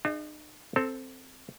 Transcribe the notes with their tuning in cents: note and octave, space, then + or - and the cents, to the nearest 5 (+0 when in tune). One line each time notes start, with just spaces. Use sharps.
D#4 -45 G#4 +0 E5 +0
C4 +0 A4 +5